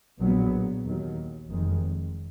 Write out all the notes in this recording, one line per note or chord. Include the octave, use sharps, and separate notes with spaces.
A#1 A#2 F#3 B3
D#2 D#3 F#3
F1 F2 D#3 G#3